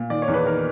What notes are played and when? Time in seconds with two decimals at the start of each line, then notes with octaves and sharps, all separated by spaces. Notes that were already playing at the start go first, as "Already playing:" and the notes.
Already playing: A#2
0.10 D#3 D5
0.22 C#5
0.28 E2
0.34 B4
0.46 D#3 A#4